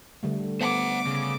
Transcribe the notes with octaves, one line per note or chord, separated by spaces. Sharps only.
D3 G3 A3
B3 C5 F#5 D6
C#3